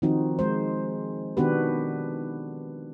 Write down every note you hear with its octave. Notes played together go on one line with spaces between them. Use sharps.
D#3 F3 C4 D#4 F#4
G#3 C5
D#3 B3 D4 F#4 G4 B4